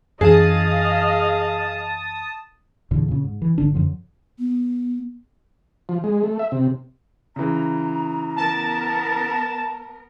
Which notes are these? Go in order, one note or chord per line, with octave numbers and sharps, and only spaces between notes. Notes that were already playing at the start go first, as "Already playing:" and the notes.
F#2 E3 G#4 D#5 F5 A5 D#6
E2 A#2 D3
A#2 C#3
G#2
E3
G1 D3 D4
F#2 D3 F3
B3
F3
G#3
A3
E5
C3
C#3 E3 A#5
B3 A#4 A5